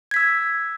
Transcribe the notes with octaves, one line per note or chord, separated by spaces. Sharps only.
E6 G#6 B6